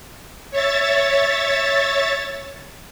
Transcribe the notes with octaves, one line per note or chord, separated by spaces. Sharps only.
C#5 E5 A6